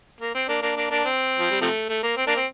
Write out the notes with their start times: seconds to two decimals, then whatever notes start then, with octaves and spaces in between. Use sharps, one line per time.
0.20 A#3
0.34 C4
0.48 A#3 D4
0.62 A#3 D4
0.76 A#3 D4
0.90 A#3 D4
1.05 C4
1.39 F3
1.51 G3
1.61 C3 F3 A3
1.89 A3
2.03 A#3
2.17 C4
2.27 A#3 D4
2.36 C4